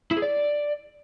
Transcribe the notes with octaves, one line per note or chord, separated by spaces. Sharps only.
E4
G#4
D5